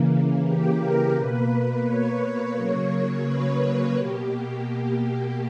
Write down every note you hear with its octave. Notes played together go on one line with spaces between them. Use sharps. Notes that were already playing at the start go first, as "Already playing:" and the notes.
Already playing: C#3 E3 A#3
G4
A#4
B2 A#3 B4
C#5
C#3 F#3 A#3
B4
B2 A#3 G4